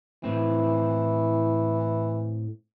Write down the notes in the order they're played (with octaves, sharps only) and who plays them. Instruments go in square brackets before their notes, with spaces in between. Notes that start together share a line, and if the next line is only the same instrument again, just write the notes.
[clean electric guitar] A2 C4 [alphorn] E3